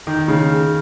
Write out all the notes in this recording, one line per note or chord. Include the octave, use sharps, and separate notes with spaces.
D#3
C#3